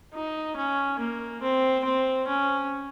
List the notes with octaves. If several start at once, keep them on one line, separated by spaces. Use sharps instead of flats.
D#4
C#4
A#3
C4
C4
C#4